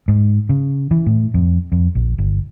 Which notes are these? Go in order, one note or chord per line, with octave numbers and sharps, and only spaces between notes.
G#2
C#3
E3
A2
F2
F2
A#1
G1